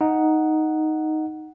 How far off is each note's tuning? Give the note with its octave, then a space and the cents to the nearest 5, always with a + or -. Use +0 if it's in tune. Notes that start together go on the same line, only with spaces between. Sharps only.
D#4 +0 F#5 +0